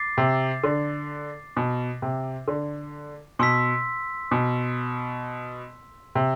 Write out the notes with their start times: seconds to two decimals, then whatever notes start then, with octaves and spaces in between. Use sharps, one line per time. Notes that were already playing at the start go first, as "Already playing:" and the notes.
Already playing: D6 A6 C7
0.18 C3
0.64 D3
1.57 B2
2.02 C3
2.48 D3
3.39 B2 C6 E6 B6
4.31 B2
6.15 C3